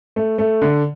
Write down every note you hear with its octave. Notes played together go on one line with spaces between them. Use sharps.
A3
A3
D3